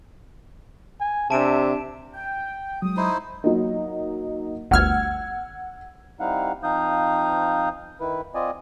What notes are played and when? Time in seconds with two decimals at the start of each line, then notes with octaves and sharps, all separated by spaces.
1.01 G#5
1.30 C3 D4 E5 A5 D7 E7
2.14 G5
2.82 F#3 G#3 D#6
2.97 D#4 E4 C5
3.44 F#3 A#3 D#4
4.71 G1 D2 F#5 E6 F6 G#6
6.20 G3 C4 D#4 E4 F5 F#5
6.63 F3 C4 D#4 F5 D#6 G6
8.00 D#3 E4 B4
8.35 C4 F4 D5 D#5 G#5